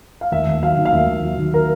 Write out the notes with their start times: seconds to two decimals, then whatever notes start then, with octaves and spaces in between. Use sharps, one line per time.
0.21 F5
0.32 D#2 E5
0.47 D#2
0.62 F#3 F5
0.77 D#3
0.85 F5
0.93 D#2 E5
1.07 D#2
1.23 F#3
1.38 D#3
1.54 A#4